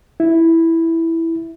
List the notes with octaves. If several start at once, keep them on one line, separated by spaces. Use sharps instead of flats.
E4